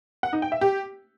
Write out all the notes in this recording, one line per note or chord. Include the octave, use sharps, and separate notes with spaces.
F#5
D#4
G5
E5
G4